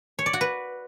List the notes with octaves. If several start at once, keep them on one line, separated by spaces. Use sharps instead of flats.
C#5
D5
F#4
B4